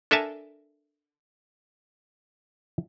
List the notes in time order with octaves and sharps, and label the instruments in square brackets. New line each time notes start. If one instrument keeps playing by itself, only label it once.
[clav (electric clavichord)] D4 A4 A#4 E5 G#5 A5